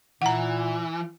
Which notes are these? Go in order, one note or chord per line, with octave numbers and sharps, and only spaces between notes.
A#2 E3 F#5 A#5